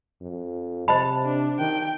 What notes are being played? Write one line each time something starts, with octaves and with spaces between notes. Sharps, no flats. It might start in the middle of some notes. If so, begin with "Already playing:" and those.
F2
C3 C5 D#5 A5 B5
D4
D#3 G5